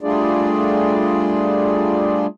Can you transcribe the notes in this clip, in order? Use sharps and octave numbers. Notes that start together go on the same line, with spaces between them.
G3 A3 D4 F4 G#4 D5